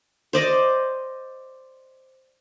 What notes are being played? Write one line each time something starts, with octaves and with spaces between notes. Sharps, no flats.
C5 D5 D#5